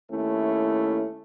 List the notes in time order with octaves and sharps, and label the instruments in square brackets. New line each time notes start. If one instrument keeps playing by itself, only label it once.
[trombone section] D#2 A3 C#4 E4